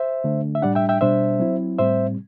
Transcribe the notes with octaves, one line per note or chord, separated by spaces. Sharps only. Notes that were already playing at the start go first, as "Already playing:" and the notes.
Already playing: C5 E5
D3 A3 D4
E5
A2 G3 D4 D5 F#5
E5 G5
E5 G5
B2 G3 D4 C5 E5
F#3 C4 E4
A2 G3 C4 C5 E5